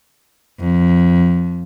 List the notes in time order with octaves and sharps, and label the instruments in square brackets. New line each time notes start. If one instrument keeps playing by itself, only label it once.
[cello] F2